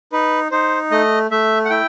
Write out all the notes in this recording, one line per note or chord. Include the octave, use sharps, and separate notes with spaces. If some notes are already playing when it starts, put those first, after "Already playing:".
D#4 B4
D#4 C5
A3 D#5
A3 E5
F#5
E4 G5